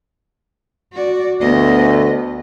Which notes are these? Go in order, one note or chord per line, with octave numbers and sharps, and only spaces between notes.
F#4 D5
D2 B3 D#5